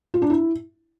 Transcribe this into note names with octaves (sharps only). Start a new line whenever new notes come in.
F4
D4
E4